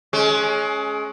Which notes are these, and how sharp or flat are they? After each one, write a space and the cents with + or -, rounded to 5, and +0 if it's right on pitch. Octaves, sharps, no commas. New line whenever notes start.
G#3 +25 C#4 +0